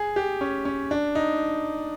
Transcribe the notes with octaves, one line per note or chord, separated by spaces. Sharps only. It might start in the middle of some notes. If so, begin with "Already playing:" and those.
Already playing: G#4
G4
C#4
C#4
D4
D#4